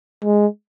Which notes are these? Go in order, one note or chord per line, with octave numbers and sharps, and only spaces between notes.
G#3